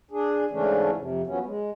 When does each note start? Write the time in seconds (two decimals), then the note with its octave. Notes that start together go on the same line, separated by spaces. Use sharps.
0.11 D4 G#4
0.51 G#2 C#3 E3 A3 C#4 D4
0.97 F2 C3
1.27 F3 F#3 B3 C#4
1.46 G#3